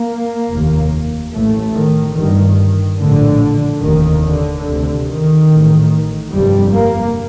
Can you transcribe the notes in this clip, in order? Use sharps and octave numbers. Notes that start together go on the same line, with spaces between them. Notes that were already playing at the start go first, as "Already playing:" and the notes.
Already playing: A#3
F1 D#2
A1 A2 A3
D#3
G1 G2 D#3
A#1 A2 D3
F1 D#2 D#3
D3
D2 C3
D#3
A1 A2
G1 F2 C3 G3
A#3